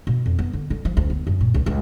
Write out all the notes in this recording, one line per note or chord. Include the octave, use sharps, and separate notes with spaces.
B2
F2
B3
D3
D3
F3
D2
B3
F#2
A#2
C#2
C#2